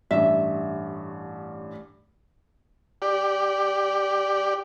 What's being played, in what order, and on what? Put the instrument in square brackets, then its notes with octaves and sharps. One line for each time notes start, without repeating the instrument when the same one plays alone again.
[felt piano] A1 G2 [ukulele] E5
[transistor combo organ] G4 D5